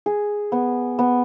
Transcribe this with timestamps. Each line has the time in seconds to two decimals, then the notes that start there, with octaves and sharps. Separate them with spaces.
0.06 G#4
0.52 B3
0.99 B3